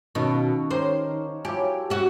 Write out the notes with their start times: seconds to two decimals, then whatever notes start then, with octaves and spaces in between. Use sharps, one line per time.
0.15 B2 D#3 C#4 A4 B4 D#5 F5 C#6
0.71 G4 A#4 C5 C#5
1.45 F3 F#3 E4 G4 G#5 D6
1.90 C#4 F#4 G4 E5